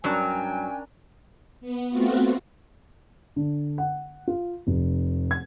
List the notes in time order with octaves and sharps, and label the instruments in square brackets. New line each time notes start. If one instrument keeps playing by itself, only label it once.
[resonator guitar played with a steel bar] G2 F#3 [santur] C#4 D4 A#4 [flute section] G5 G#5
[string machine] B3
A3 B3 C4 F4 F#4
[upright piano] D3
F#5
F4
F1
G#6